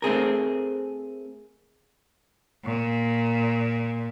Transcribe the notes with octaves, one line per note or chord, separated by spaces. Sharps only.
A3 C4 G#4 A#4
A#2